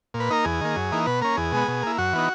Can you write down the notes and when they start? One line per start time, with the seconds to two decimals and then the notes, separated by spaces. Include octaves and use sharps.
0.14 A#2
0.20 B4
0.30 A#3 D#4 A#4
0.45 E2 G#4
0.61 D#3 A#3
0.76 F#2
0.92 E3 A#3 D#4
1.06 B2 B4
1.21 A#3 C#4 A#4
1.37 E2 G#4
1.52 B2 G#3 B3
1.68 B2
1.82 A#3 E4
1.98 F#2 F#4
2.13 E3 B3 D#4